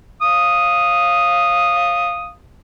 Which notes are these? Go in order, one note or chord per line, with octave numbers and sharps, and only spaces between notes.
F5 D#6